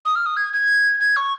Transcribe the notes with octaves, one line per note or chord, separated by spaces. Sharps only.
D#6
F6
D#6
G#6
G#6
G#6
C#6